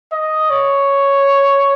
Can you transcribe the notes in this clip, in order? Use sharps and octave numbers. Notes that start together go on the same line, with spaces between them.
D#5
C#5